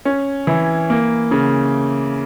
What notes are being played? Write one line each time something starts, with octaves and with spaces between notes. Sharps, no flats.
C#4
E3
A#3
C#3